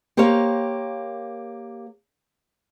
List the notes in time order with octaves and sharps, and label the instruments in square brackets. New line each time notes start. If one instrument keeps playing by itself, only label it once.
[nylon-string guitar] A#3 G4 A#4 C5 C#5 F5